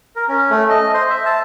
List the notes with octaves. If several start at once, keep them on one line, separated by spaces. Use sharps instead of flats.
A#4
C#4
A3
D#5
C5
E5
A5